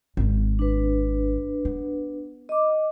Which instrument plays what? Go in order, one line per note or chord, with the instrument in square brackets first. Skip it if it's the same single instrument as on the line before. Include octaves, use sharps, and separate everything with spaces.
[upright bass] G#1 C4
[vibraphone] D4 B4
[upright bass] B3
[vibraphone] D#5 D6